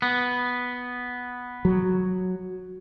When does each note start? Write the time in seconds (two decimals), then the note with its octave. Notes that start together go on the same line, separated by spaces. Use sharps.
0.02 B3
1.65 F#3